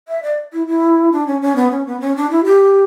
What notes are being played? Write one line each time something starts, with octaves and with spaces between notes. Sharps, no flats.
E5
D5
E4
E4
D4
C#4
C#4
B3
C#4
B3
C#4
D4
E4
G4